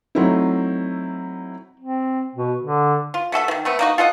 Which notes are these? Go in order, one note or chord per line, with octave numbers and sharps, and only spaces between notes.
F#3 A3 C4 D#4 E4
C4
B2
D3
F4
A3 F#4 A4 E5
D#3 F3
A3 B3 C4
A#3 D#4 F#4
F4 A4 D#5 F#5